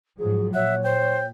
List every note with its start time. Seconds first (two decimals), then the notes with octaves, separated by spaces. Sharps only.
0.19 G#2 F3 F#3 G#4
0.54 A#2 C#5 E5 F#5
0.84 C5 G5